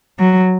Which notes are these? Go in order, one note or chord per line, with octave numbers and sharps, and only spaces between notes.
F#3